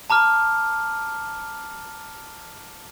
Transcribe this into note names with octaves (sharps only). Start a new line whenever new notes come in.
A5 A#5 D6 F6